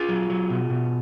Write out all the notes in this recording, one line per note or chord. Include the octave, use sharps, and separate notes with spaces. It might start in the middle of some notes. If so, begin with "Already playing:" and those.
Already playing: F4 G#4
F#3
F#3
B2
B2